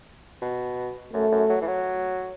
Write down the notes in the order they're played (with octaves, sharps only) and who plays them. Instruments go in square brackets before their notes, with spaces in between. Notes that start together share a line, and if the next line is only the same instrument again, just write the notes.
[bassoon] B2
[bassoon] F#2 [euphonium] A3
[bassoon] F#2
F#3
E3
F#3